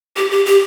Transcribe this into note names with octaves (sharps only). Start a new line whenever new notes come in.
G4
G4
G4